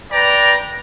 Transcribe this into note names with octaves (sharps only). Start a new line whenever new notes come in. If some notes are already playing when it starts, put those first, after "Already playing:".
B4 D5 G5 A#5